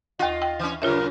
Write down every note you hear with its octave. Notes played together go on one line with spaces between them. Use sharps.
D#2 F4 D#5 F#5
G5
E3 C#4
F#2 A#2 C#3 F4 A#4 C#5 E5